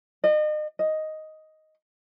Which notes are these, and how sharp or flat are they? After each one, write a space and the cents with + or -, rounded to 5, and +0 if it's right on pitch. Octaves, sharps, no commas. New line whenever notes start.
D#5 -35
D#5 +5